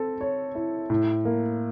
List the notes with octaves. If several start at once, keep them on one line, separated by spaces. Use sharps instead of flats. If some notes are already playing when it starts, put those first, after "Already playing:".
Already playing: C4 A4
C#5
E4
A2
A#3